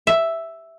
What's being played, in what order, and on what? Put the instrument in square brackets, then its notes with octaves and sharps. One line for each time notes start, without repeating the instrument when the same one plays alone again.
[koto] E5